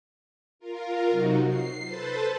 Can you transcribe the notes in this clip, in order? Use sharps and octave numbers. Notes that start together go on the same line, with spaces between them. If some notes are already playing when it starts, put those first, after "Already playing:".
F4 A#4
C3 F#3 D#4 F#4
C7
A4 B4 C5 A5